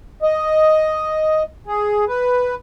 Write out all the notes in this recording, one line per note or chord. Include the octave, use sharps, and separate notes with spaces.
D#5
G#4
B4